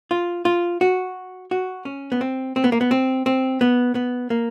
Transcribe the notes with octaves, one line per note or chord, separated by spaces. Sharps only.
F4
F4
F#4
F#4
C#4
B3
C4
C4
B3
A#3
B3
C4
C4
B3
B3
A#3